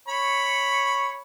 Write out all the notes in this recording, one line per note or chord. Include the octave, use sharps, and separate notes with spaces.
C#5 B5 C#6